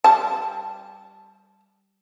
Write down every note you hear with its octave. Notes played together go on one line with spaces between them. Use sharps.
G3 A5